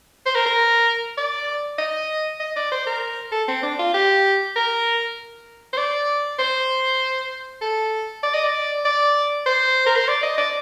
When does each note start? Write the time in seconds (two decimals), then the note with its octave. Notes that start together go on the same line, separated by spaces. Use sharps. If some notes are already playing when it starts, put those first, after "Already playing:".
0.26 C5
0.35 A#4
0.46 A#4
1.17 D5
1.78 D#5
2.40 D#5
2.56 D5
2.72 C5
2.86 A#4
3.32 A4
3.48 C4
3.63 D4
3.79 F4
3.94 G4
4.56 A#4
5.73 C5
5.77 D5
6.39 C5
7.62 A4
8.23 D5
8.34 D#5
8.43 D5
8.85 D5
9.46 C5
9.86 A#4
9.96 C5
10.08 D5
10.23 D#5
10.38 D5